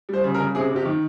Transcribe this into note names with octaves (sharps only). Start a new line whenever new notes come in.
G3 C5
C#3
A#4
C#3
C3 G#4
C3
G4
D#3